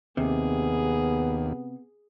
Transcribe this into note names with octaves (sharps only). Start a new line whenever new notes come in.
D#2 C3 B3 G#4